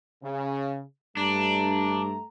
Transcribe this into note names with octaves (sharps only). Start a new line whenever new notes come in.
C#3
G2 A3 D4 A#5